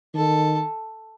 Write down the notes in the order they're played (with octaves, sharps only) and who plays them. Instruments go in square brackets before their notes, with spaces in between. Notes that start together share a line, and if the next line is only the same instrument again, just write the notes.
[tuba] D#3 [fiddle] A4